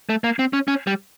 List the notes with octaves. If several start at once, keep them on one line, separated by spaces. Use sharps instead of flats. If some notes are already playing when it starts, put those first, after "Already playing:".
A3
A#3
C4
C#4
C#4
G3